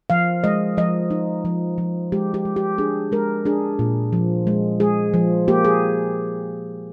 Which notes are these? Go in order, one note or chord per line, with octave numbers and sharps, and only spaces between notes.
F3 F5
G#3 D#5
F3 D#5
D#4
F3
F3
G#3 G4
G4
G#3
G4
D4 G#4
G#3 A#4
D4 G#4
A#2
F3
G#3
G#3 G#4
F3
A#3 G4
G#4